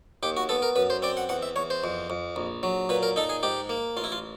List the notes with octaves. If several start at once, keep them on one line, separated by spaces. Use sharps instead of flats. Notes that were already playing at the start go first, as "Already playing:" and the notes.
D#2 G4
F#4
B3 A4
A#4
F#2 B4
C5
C4 D5
F#5
E2 F#5
E5
E2 C#5
C5
F2
F2
A#1
F#3
A#2 B4
A#4
D#4 A4
G#4
G#2 G4
A#3
A1 F4
E4
F4